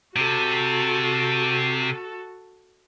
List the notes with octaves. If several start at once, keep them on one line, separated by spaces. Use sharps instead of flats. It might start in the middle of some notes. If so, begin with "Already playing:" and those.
C3 F#4 A4